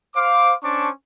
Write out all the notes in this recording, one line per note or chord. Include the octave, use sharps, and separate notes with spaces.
C5 F5 D6
C#4 D4 C5 A5 C#6 D6